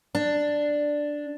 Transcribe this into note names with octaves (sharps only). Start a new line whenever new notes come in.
D4